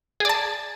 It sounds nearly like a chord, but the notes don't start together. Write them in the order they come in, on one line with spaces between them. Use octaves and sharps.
G#4 D5 A5